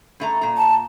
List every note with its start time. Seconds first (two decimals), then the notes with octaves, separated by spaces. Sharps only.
0.20 G2 A3 A#5
0.41 A#2 A#5
0.57 A5